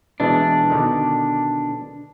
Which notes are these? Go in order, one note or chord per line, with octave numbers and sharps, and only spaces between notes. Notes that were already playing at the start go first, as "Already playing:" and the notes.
B2 E3 G#3 D4
B2 D3 D#3